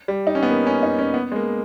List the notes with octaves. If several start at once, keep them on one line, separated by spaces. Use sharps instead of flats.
G3
D#4
C#4
B3
A#3
C#4
D#4
C#4
B3
G#3
A#3